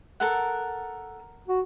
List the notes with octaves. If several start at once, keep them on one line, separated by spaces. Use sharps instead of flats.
A4 A#4 F#5
F#4